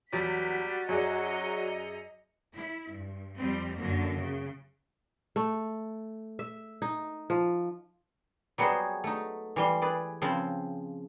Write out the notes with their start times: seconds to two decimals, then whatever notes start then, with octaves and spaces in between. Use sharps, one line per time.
0.13 E2 F#3 G3 F#4 B6
0.89 F#2 F#3 G#4 D5 D#5 A#5 C#7
2.54 E4
2.93 G2
3.38 F2 G3 C4
3.77 F#2 D3 F#3 A#3
4.18 C#3
5.36 A3
6.39 E5
6.82 D#4
7.30 F3
8.58 F#3 G3 B3 F#4 G#4 C5
9.04 A3 D#4
9.56 E3 G3 C6
9.82 G#4 B4 D5
10.22 C#3 F3 C4 C5 B5